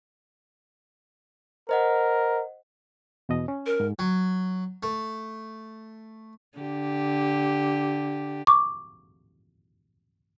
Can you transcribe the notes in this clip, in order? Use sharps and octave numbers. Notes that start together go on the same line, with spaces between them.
A#4 C5 D#5 F#5
E2 B2 D#5
C#4
A#4
G#2
F#3
A3
D3 G4
C#6 D6